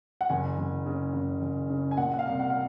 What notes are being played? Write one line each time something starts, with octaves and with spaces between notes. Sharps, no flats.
F#5
F#1 G#5
F#1
C#3
F#1
F#1
C#3
G#5
A#2 F#5
F#5
F5
C2
F#5
F#5